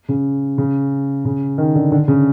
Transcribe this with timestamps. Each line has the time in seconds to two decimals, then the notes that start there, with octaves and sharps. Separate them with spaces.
0.09 C#3
0.58 C#3
1.25 C#3
1.58 D#3
1.75 D3
1.92 D3
2.08 C#3